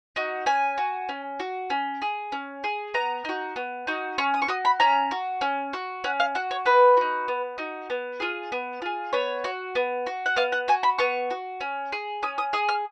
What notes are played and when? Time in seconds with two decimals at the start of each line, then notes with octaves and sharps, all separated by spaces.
0.16 D#4 F#4
0.46 C#4 G#5
0.78 F#4
1.09 C#4
1.40 F#4
1.70 C#4
2.02 G#4
2.32 C#4
2.64 G#4
2.94 B3 A#5
3.25 D#4 F#4
3.56 B3
3.87 D#4 F#4
4.18 C#4 C#6
4.34 D#6
4.42 C#6
4.48 F#4 D#6
4.65 B5
4.80 C#4 A#5
5.11 F#4
5.41 C#4
5.73 F#4
6.04 C#4 F#5
6.20 F5
6.35 F#4 F#5
6.51 C#5
6.65 B3 B4
6.97 D#4 F#4
7.28 B3
7.58 D#4 F#4
7.90 B3
8.20 F4 G#4
8.52 B3
8.82 F4 G#4
9.13 B3 C#5
9.44 F#4
9.75 B3
10.07 F#4
10.26 F#5
10.36 B3 F5
10.52 F#5
10.68 F#4 G#5
10.83 B5
10.98 B3 C#6
11.30 F#4
11.61 C#4
11.92 G#4
12.23 C#4 D#6
12.38 D#6
12.53 G#4 D#6
12.69 F6